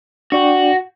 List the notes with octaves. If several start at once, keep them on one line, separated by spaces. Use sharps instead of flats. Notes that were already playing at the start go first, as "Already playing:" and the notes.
D4 F#4 D5 G5